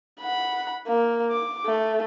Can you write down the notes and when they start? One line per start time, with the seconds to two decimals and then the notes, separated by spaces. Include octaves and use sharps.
0.21 F#5 B5
0.87 A#3
1.31 D6
1.66 A3